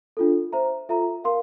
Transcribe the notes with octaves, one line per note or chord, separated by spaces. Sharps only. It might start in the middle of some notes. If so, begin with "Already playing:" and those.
D4 F4 A4
C5 E5 A#5
F4 A4 E5 A#5
A#4 F5 C6